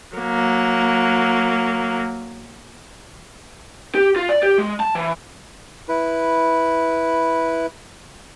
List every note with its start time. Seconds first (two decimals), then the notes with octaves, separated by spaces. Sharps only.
0.16 F#3 A#3
3.95 G4
4.16 F4
4.29 D5
4.43 G4
4.58 G#3
4.80 A5
4.95 E3
5.89 E4 B4